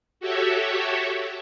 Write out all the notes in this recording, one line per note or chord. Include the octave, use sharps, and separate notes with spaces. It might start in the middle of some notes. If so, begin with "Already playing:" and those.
F#4 G4 A4 C#5 E5